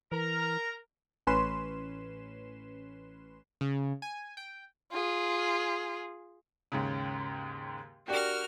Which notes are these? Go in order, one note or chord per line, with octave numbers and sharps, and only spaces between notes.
E3 A#4 A#5
A1 C#4 B4 C6 E7
C#3
G#5
G5
F4 G#4
D#2 G#2 C#3
D4 F#4 G4 A#4 F6